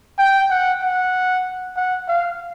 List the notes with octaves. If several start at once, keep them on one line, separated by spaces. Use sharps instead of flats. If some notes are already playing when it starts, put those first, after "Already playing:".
G5
F#5
F#5
F#5
F5